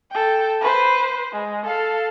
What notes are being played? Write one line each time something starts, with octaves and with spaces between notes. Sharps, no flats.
A4 G5
B4 C5
G#3
A4 F5